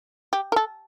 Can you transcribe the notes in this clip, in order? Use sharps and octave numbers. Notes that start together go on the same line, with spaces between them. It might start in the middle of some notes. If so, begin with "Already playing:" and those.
G4
A#4
A4